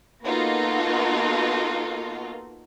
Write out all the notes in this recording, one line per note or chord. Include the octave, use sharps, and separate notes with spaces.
A#3 B3 D#4 F4 F#4 A4